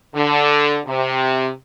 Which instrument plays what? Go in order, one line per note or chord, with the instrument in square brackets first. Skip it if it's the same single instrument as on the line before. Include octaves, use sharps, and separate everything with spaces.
[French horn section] D3
C3